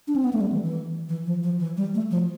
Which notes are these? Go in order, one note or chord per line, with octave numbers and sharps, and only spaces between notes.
D4
C4
B3
A3
G3
E3
E3
E3
F3
F3
E3
G3
A3
F3